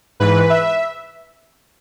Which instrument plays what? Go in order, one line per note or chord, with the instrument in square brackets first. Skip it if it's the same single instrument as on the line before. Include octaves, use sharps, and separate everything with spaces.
[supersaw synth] G#2 E3 B4
E5